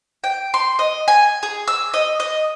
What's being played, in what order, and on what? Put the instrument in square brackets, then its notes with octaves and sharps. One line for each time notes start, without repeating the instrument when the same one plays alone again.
[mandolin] G5
C6
D#5
G#5
G#4
E6
D#5
D#5